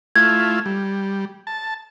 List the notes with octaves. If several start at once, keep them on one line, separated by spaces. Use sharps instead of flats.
A3 E4 F4 G#6
G3
A5